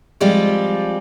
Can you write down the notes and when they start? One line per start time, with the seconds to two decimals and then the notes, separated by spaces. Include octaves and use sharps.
0.20 F3 G3 G#3 C4 F4 G4